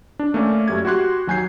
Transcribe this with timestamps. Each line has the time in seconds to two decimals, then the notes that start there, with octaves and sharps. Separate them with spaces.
0.19 D4
0.34 A3 A#3 C#4 D5
0.68 F#2 A3 G4 G#6
0.85 F#4 G4 C6 F#6
1.27 D#2 F#3 G#5 G6 C7